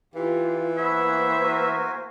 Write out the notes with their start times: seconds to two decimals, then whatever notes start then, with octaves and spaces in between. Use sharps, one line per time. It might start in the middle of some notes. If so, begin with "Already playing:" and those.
0.15 E3 F4 G4
0.77 A#3 B3 C5 C#5 E5
1.43 F#4 A#4 G#5